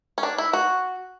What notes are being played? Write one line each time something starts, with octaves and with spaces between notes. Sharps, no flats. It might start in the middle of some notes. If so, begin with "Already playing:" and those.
C#4
D4
E4
F#4